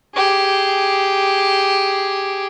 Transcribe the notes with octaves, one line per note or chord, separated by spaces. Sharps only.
G4 G#4